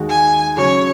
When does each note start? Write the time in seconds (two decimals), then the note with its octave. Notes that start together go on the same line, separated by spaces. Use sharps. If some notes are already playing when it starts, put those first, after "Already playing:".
Already playing: D#2 D#3 G#3 D#4 F#4
0.09 G#5
0.57 C#3 F#3 C#4 C#5